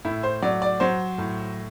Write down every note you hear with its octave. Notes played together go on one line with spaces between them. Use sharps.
A2 E4
C5
F#3 D5
D5
F#3 C5
A2